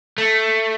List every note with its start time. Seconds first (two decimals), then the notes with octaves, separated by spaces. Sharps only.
0.18 A3